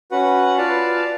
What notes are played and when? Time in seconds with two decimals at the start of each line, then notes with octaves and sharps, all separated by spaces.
0.11 C#4 F#4 B4 F#5
0.57 F4 B4 D5 F5 A5